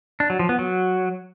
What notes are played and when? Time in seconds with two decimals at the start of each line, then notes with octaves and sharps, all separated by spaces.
0.20 D4
0.30 F#3
0.39 F3
0.49 B3
0.59 F#3